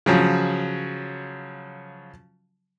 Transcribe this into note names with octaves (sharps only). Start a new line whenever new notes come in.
C#3 F3 F#3